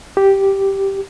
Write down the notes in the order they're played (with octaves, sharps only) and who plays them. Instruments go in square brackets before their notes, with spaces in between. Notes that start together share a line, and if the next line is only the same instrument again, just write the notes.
[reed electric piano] G4